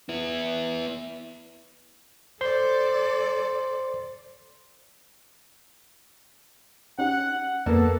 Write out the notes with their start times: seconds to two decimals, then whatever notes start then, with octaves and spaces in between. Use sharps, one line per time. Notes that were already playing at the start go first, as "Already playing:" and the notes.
0.09 B3 E4
2.41 A4 C5 D5 C6
6.99 C#4 D#4 G4 F#5
7.66 F2 A#3 B3 A4